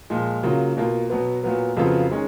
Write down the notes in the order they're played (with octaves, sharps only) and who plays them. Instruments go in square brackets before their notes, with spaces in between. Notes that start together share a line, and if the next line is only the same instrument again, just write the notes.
[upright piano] A#2 F3 G#3
C#3 F#3 A#3 F4
B2 A#3 F4
B2 F#3 B3
A#2 F#3 B3
F2 C#3 F#3 B3 F4
D#3 G#3 C#4